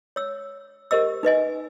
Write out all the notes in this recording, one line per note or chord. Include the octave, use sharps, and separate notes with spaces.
C#5 E6
G4 A#4 C5 D#5 E6
D#4 B4 D#5 G#5